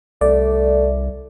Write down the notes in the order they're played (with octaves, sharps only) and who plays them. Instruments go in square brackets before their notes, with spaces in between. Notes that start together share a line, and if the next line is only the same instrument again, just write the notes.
[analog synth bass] C2 [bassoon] A3 [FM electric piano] D5